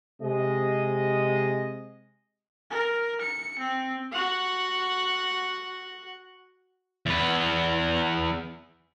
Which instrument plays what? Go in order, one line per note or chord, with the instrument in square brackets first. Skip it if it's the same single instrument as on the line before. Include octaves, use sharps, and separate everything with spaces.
[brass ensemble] C3 G#3 D#5
[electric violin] A#4
C#7
C4
[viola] F#4 F#5
[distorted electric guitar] E2 B4